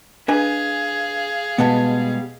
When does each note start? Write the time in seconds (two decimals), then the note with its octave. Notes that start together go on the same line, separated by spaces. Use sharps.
0.28 D4 G#4 B4 D#5 F5 G#5
1.58 B2 G3 G#3 B3 D#5 A5